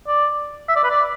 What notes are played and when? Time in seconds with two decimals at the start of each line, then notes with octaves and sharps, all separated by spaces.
0.07 D5
0.69 E5
0.76 D5
0.84 B4
0.90 D5